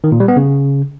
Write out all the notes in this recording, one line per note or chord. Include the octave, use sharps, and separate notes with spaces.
D#3
A#2
G3
B3
C#3